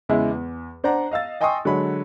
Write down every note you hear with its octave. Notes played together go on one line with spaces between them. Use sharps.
E2 C#3 G#3 E4
E2
D4 C5 D5 F#5 A#5
D#5 F5 E6 A6
D#5 G5 G#5 C6 C#6 D#6
D3 F#3 G#3 C#5 B5